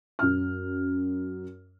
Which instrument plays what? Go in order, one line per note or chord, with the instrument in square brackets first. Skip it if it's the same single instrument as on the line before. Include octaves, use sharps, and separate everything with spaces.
[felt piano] F#2 F6